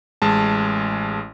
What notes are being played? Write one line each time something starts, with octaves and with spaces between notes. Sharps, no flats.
A1 G#3 A5